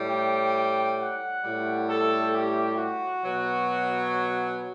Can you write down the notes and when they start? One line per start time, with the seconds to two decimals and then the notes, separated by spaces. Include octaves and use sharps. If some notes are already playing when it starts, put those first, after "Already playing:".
Already playing: A2 G3
0.09 G5
0.54 G5
0.98 F#5
1.43 A2 G3
1.88 A4
2.33 G4
2.77 F#4
3.22 B2 F#3